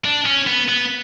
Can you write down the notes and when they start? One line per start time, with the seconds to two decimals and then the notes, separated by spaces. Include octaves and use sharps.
0.05 D4
0.26 C#4
0.47 B3
0.68 B3